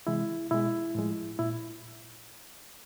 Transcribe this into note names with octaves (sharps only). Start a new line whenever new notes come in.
C3 E3 G#3 E4
B2 G#3 E4
A2 F3 G#3
A#2 E4